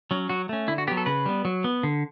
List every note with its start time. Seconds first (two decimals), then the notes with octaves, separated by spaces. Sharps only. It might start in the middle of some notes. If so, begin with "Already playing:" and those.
0.11 F#3 C#4
0.29 F#3 F#4
0.49 A3 C#4
0.68 D3 E4
0.78 F#4
0.87 B3 G4
0.91 F#3
0.97 A4
1.06 C#3 B4
1.26 G3 B3
1.45 F#3
1.64 B3
1.83 D3